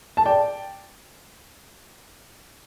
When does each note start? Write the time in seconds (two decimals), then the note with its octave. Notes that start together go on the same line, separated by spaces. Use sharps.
0.17 A5
0.26 D5 G5